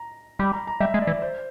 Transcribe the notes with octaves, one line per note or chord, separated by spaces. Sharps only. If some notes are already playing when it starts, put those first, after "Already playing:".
Already playing: A#5
G3 B5
A#5
A#5
G3 E5
G#3
D5
E3
C5